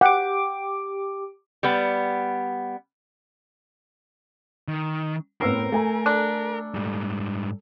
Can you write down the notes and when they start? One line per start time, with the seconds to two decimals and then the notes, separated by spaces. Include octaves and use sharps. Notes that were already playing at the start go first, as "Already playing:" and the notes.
0.01 G4 F#5 D6
1.63 G3 B3
4.68 D#3
5.41 A2 B3 C4 A#4 B4 E6 C7
5.72 A3 A4 G#5 A#5
6.06 D4
6.74 G#2 G3